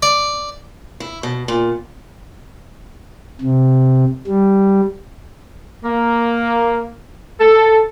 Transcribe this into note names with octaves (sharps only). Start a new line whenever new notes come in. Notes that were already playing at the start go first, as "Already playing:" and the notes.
D5
E4
B2
A#2
C3
G3
A#3
A4